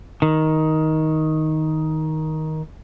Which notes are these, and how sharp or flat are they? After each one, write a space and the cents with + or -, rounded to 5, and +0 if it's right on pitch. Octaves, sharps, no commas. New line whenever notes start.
D#3 +10